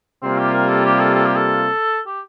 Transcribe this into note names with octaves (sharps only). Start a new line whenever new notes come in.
C3 G3 A#3 C4 F4
G4
A#4
A4
G4
A4
A4
G4
A4
G4